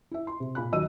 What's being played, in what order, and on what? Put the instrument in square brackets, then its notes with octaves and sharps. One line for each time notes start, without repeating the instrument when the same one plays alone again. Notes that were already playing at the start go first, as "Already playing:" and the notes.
[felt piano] E4 E5
C6
C3
A#2 B5 F#6
D#2 F#3 D#5 E6 D#7